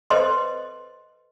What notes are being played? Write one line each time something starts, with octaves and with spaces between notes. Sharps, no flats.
A4 B4 C5 D#5 C6